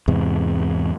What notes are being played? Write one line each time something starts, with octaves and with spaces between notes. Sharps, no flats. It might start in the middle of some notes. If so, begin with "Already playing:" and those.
E2 G#2 C3